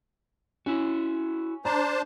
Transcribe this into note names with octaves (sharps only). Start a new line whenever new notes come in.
C#4 E4 F#4
D4 C5 A5 A#5